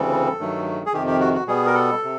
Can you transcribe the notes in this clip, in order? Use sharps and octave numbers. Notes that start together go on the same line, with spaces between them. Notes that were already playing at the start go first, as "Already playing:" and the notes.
Already playing: D2 C#3 E3 G3 C4 A4
G2 D#3 F#3 A3
G#4
F2 C3 D#3 G4
G4
F#4
F#4
B2 G3 B3 G#4
A#4
A4
C3